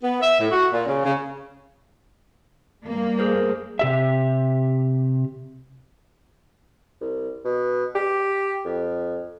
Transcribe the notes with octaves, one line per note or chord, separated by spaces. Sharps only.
B3
E5
A2
F#4
A#2
C#3
C#3
G2 A#3
G#4 A#4 C5
C3 G4 E5
C2
B2
G4
F2